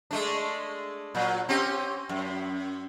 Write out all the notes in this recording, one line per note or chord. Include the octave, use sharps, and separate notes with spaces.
G#3 A3 D4
A#2 F#3
C4 C#4 G4
F#2